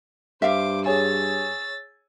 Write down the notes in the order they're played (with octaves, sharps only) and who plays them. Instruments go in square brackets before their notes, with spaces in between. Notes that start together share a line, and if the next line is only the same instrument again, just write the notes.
[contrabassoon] G2 [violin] C5 D6 [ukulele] E5 F5
[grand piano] G#4 C#5 G#5 [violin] E6 A6